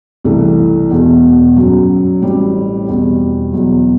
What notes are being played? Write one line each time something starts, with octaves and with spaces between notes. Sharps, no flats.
C2 C3 E3 A3
E1 E2 B2
G1 F#2 F#3
A1 A2 G3 C4
E2 B2 G3 C4
E2 B2 F#3